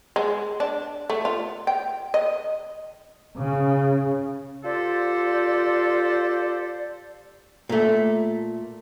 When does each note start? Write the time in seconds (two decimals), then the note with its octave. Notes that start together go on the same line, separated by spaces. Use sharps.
0.16 G#3
0.60 D4
1.10 A3
1.25 F4
1.67 G5
2.14 D#5
3.38 C#3
4.64 F4 G4 A4 C5 D5
7.69 A#2 A3